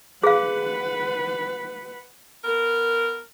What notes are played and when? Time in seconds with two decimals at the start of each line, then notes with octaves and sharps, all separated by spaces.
0.23 G#4 B4 F5 F#5
2.44 B3 A#4